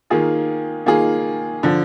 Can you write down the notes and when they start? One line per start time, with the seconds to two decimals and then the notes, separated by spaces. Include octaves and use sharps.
0.10 D#3 A#3 F4 G#4
0.86 D#3 A#3 F4 G#4
1.63 D3 F3